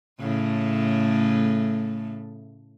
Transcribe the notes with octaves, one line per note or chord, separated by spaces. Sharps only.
A2 C#3 A3